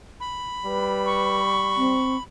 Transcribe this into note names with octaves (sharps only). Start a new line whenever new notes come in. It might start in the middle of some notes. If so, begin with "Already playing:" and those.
B5
G3 B4
C#6
C4